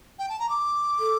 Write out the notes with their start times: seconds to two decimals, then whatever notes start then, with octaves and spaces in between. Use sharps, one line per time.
0.19 G5
0.29 A5
0.39 A#5
0.49 D6
0.99 A4